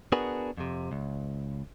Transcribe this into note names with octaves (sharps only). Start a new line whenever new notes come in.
B3 D4 F#4 G#4 A#4 B4
F2 C3
C#2